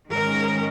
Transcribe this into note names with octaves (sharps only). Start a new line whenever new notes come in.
G#2 D#3 G#3 C#4 A#4